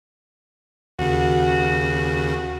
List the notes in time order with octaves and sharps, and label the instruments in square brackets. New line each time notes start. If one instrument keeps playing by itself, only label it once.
[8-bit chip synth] D#2 C#3 [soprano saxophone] F#4